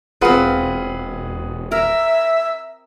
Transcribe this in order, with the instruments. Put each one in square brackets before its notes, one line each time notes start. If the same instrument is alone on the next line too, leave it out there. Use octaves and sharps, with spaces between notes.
[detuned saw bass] E1 [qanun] C4 F4 [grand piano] G#4 B4 F#5
[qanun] A#4 [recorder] E5